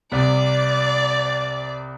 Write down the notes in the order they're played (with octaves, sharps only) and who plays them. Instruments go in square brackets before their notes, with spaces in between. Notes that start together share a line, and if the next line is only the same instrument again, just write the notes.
[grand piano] C2 C3 [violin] D5